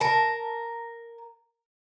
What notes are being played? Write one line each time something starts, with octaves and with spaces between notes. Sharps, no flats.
A#4 A5